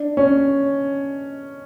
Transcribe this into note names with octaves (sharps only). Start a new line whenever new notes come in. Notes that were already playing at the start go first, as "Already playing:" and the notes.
Already playing: D4
C#4